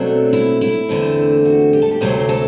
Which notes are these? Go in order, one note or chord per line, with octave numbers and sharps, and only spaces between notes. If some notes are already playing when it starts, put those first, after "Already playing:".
Already playing: B2 F#3 A3 C4 D4
E4
E4
E2 D3 A3 C4
F#4
G4
A4
G4
D2 C3 F#3 A3 C4 C5
A4